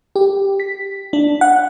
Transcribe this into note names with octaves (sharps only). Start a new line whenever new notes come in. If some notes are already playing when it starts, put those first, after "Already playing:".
G4
B6
D4
F#5